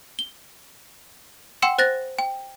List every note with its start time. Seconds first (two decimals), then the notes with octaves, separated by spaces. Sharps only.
0.19 G7
1.62 F#5 G5 C6 E6 C#7 E7
1.78 C5 F#6 A6 A#6
2.19 G5